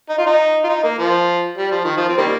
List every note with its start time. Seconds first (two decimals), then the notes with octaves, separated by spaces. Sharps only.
0.09 D#4
0.18 F4
0.26 D#4
0.64 F4
0.69 D#4
0.84 A#3
0.99 F3
1.58 G3
1.71 F3
1.84 D#3
1.97 F3
2.09 C4
2.17 D#3 G3 A#3